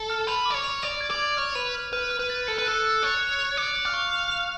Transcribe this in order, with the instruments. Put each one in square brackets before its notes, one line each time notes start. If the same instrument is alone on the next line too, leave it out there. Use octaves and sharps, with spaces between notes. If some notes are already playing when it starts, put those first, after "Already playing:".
Already playing: [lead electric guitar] A4
[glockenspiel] F6
[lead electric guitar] B4 [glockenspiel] F7
[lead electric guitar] D5 [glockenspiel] D6
[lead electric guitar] C#5
[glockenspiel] F7
[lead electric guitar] D5 [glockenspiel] F7
[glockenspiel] G#6
[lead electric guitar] D5
[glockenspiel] G#6
[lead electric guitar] C#5 [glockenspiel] F6
[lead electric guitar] B4 [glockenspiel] F7
[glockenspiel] F6
[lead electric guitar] B4 [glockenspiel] F6
[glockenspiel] F6
[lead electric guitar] B4
[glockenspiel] A6
[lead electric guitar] A4 [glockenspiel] C#7
[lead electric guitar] B4
[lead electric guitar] A4 [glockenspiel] F#6
[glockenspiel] C#7
[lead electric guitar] C#5 [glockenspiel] F#6
[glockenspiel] F7
F7
[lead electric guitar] D5 [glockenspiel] C#7
[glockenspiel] C#7
[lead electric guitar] F5
[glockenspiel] C#6
F7
F7